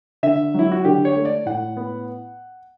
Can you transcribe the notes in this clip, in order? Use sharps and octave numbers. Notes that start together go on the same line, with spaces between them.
D3 E5
F#3 E4
F#4
D3 G4
C#5
A3
D5
A2 F#5
B3